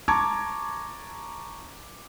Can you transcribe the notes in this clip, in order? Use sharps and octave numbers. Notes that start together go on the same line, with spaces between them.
A5 A#5 C#6 D6 G#6